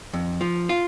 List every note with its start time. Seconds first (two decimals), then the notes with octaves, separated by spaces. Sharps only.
0.13 F2
0.41 F3
0.69 F4